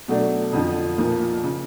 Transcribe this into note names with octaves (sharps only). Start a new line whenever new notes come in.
B2 F#3 A3 D4
F2 D3 F3
B1 A#2 F3 A#3
C#3